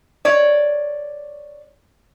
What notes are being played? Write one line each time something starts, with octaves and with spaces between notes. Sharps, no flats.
C#5 D5